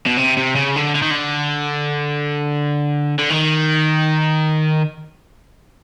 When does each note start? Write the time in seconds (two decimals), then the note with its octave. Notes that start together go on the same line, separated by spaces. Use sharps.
0.07 B2
0.17 C3
0.37 C3
0.56 C#3
0.76 D3
0.95 D3
1.02 D#3
1.11 D3
3.18 D3
3.30 D#3